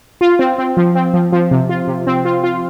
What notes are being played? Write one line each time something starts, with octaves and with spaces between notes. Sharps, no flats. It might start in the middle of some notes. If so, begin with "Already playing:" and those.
F4
C4
C4
F3
C4
F3
F3
C3
F4
C3
C4
F4
F4